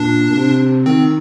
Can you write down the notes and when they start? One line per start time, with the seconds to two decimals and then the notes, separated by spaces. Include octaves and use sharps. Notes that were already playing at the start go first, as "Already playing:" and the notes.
Already playing: A#2 D4
0.30 A#2
0.35 C3
0.86 D#3 C4